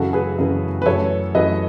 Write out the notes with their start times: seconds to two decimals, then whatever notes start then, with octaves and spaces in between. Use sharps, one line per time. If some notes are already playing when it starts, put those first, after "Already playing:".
Already playing: F#2 C#3 E3 F#4 A4
0.13 G#4 B4
0.38 F#2 C#3 E3
0.82 B4
0.86 F#2 E3 A3 A4 C#5
1.35 F#2 E3 A3 B4 D#5